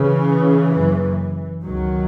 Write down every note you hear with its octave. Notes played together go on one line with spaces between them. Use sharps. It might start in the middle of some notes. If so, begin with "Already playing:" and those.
Already playing: C#3 E3
F#1 F#2 C#3
C#2 B2 D#3 F#3